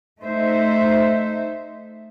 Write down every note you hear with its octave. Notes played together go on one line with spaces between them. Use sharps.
A3 D#4 C5 E5